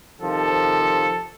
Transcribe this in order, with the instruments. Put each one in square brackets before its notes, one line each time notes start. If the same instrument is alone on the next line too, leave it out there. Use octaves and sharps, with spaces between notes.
[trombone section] C3 D#3 F3 [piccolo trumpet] A4